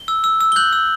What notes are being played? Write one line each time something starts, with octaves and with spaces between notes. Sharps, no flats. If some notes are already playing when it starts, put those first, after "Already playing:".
Already playing: G7
E6
E6
E6
G7
F#6 G6 F#7
E6